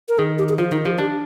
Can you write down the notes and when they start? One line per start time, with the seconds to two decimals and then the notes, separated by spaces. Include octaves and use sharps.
0.09 A#4
0.18 D#3 G#4
0.38 G4
0.49 G#4
0.58 F3 F4
0.72 D#3 D#4
0.85 F3 G4
0.98 D4 G4